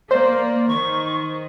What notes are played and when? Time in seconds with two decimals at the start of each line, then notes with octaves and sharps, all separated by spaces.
0.11 A#3 C5 D5
0.68 D#3 C#6